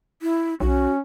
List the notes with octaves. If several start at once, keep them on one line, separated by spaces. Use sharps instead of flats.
E4
B1 C#4 F#4